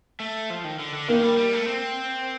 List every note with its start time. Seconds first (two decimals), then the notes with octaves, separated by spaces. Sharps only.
0.20 A3
0.50 F3
0.64 D#3
0.79 D3
0.94 D3
1.08 D#3 A#3
1.22 G3
1.37 G3
1.53 A3
1.67 C4